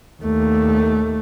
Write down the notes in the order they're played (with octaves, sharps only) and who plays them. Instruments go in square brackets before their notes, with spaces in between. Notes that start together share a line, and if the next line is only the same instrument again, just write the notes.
[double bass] D#2 A3